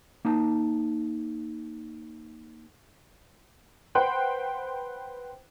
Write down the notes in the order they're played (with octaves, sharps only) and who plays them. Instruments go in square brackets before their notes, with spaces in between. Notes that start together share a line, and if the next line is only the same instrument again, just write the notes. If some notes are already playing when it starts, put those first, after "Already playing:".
[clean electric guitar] A#3 D#4 A5
[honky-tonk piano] B4 C5 F#5 G5 C6 F#6